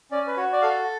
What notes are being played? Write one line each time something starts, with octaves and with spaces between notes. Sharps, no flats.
C#4 D5
B4
F#4 C#5
D5
A4 F5